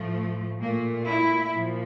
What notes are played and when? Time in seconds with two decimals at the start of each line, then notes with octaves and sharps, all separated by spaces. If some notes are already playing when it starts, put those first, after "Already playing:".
Already playing: A2 F3 A3
0.61 A#2 A3 A#3
1.07 E4
1.52 A#2 F3